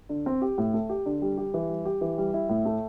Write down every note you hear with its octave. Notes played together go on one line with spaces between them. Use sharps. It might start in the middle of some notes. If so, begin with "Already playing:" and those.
D3
C4
G4
A2
A3
G4
D3
G3
G4
E3
G3
G4
E3
G3
E4
A2
A3